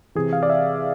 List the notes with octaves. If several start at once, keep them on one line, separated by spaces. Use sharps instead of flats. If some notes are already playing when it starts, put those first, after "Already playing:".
C3 E3 G#4
F5
D5
E5